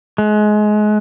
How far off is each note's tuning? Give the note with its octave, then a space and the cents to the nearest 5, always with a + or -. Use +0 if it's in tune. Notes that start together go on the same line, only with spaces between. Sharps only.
G#3 +25